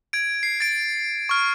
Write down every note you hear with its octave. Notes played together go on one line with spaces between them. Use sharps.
G#6 D7
C7
A6 D7
C#6 F6